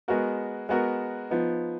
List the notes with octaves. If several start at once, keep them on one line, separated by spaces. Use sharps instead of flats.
G#3 B3 F#4 A#4
G#3 B3 F#4 A#4
F3 B3 D#4